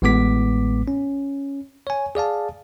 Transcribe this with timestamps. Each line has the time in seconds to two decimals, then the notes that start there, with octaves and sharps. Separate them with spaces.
0.02 A1 A2 G#3 B3 D6 B6
0.88 C#4
1.87 C#5 G#5
2.15 G#4 D5 F5 A5